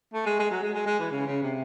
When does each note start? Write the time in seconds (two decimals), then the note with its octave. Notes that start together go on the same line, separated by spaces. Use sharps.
0.14 A3
0.26 G#3
0.39 G#3
0.51 F#3
0.63 G#3
0.75 G#3
0.87 G#3
0.99 E3
1.11 C#3
1.27 C#3
1.43 C3